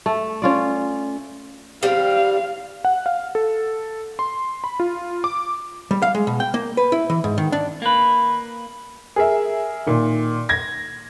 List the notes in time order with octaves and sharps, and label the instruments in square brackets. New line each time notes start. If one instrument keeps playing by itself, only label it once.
[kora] A3
C#4 F4 D5
[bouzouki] G3 C4 [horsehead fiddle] F5
[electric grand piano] F#5
F5
A4
C6
B5
F4
D6
[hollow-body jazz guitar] G3
F5
G#3
B2
G5
A#3
B4
E4
E3
G#2
D#3
D4
[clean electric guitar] A#3 B4
[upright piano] G#4 A#4 E5
A#2 D#3
G#6 A#6